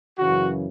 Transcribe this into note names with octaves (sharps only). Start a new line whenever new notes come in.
F#2 C#3 E3 F#4